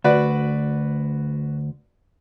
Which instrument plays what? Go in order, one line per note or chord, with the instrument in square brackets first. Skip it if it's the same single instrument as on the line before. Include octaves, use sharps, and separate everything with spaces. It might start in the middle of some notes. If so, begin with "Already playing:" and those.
[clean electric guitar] D2 [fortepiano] F#4 B4 D5